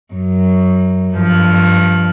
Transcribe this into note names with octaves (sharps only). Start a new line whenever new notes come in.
F#2
G2 F3